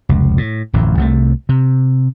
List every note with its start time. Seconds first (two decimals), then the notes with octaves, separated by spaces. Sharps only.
0.09 F1 C#2
0.38 A2
0.74 D1 A1 F2
0.97 C2 C3 A3
1.49 C3